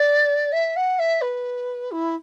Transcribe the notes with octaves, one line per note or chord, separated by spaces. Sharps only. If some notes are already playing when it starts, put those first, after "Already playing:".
Already playing: D5
E5
F#5
E5
B4
E4